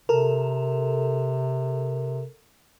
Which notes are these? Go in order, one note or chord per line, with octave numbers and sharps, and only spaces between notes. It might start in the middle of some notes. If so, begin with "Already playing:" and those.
C3 A4 A#4